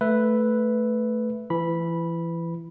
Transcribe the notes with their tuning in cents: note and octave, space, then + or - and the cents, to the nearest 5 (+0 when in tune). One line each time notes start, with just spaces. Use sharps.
A3 +0 B4 +0 E5 +0
E3 +25 B5 -10